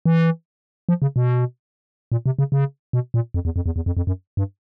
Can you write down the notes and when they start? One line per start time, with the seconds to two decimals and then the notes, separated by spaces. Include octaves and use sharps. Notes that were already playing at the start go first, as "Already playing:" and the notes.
0.06 E3
0.89 F3
1.02 C#3
1.16 B2
2.12 A#2
2.26 C3
2.39 C#3
2.52 C#3
2.93 B2
3.14 A#2
3.34 F2
3.45 E2
3.56 F2
3.66 E2
3.76 E2
3.86 F2
3.97 F2
4.07 F#2
4.37 G2